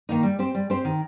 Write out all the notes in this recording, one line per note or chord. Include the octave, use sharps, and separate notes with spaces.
D#3 A#3 D#4
G3
C4 G4 C5
G3
C4 G4 C5
D#3